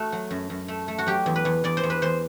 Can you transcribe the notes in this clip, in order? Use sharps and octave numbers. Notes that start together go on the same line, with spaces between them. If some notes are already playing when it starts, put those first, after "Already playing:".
Already playing: A3 F#4
F#3
F#2
F#2
A3
A3
F#4
F#3 G4
E2
B4
E2
E2 D5
C5
E2
B4
E2 C5